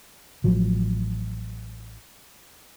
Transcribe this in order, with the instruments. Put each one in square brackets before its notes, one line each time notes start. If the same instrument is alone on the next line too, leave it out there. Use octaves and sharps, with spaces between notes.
[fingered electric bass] A1 F3 F#3